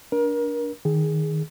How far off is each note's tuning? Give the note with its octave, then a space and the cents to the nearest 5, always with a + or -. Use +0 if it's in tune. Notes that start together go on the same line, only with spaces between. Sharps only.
D4 -20 A#4 +30
D#3 +0 G#4 +0